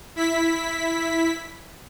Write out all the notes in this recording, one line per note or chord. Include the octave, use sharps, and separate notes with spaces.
E4 B6